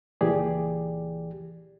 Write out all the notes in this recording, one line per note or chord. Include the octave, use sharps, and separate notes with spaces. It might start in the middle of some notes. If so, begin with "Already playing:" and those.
C#2 A#2 E3 G4 G#4 D5